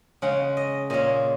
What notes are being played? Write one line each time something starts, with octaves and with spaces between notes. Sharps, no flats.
C#3 G#3 C#4 F#5
D#5
A#2 G#3 C#4 D#5